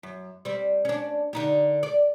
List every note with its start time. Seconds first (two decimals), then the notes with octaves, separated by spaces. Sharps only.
0.03 F#2
0.45 G3 C4
0.85 C#4 D4
1.33 D3 D#4 G4
1.83 D5